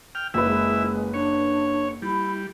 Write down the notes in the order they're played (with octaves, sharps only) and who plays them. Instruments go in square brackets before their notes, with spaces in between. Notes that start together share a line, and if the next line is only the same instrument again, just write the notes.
[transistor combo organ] G5 F6
[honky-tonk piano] F#1 B4 [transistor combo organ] E4 E5
[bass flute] G#3
[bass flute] D4 [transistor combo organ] C#5
[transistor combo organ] G3 [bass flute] E4